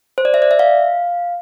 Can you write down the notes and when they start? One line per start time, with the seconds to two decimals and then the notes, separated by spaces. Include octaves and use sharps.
0.18 C5
0.25 D5
0.34 E5
0.42 D5
0.51 E5
0.59 F5